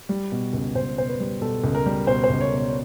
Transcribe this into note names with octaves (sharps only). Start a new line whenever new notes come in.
G3
B2
C#2
C#2 C5
B2 C5
B4
G3
B2 A4
C#2
A#4
G3
B2 C5
C5
C#2
C#5
B2 C#5
C#5